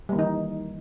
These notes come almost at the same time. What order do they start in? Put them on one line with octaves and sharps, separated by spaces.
G3 A#3 D#3 D#4 E3